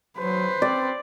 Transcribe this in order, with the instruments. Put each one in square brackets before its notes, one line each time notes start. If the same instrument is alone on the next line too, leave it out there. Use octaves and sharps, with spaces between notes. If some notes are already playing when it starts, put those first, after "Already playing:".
[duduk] F#3 [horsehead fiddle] B4 C5
[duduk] C4 [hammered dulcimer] D5